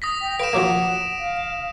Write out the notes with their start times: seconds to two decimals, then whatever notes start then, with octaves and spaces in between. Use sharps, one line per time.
0.02 D#6 A#6 B6
0.21 G5
0.40 B4 F5 D7 E7
0.53 F3 F#3 A#3 F#5
1.19 F5